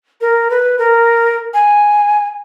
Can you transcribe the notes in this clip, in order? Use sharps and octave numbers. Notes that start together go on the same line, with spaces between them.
A#4
B4
A#4
G#5